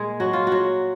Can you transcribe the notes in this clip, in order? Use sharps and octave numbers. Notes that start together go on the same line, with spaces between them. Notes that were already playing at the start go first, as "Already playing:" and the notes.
Already playing: A#2 G#3 G#4
F#3 F#4
F4
F#3 F#4